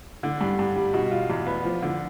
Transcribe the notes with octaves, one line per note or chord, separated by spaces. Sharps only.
D3
G2
G2
G3
B2
F4
E2
B3
F3
D3